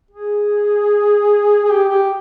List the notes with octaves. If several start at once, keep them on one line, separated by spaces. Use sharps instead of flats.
G#4
G#4
G4
G4